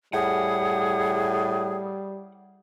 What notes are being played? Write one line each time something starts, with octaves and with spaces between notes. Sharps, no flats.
A2 G3 G#4 F#5